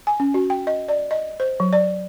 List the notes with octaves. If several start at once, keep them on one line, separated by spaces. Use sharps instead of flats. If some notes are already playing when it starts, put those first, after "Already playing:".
G#5
C#4
F#4
G5
D#5
D5
D#5
C5
F#3
D5